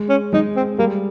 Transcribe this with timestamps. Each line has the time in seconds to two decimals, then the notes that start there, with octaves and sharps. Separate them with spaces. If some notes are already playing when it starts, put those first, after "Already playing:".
Already playing: G#3
0.09 C#4
0.33 G#3 D#4
0.56 C4
0.79 G3 A#3